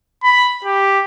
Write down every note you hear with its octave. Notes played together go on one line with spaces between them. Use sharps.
B5
G4